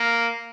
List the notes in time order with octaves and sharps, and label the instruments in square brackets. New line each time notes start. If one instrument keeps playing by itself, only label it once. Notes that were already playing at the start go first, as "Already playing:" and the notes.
Already playing: [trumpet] A#3